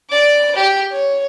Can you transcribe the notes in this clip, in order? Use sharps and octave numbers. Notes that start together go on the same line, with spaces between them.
D5 D6
G4
C#5